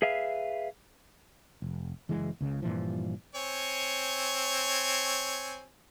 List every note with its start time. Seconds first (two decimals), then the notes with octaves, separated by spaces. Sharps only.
0.02 G#4 B4 E5 F5
1.62 F1
2.09 F#1 E3 G#3
2.41 C#2 C#3
2.62 G2 A#2 E3 F3
3.35 C4 C#5 G#5